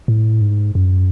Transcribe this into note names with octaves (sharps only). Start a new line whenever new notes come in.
A2
G#2
F#2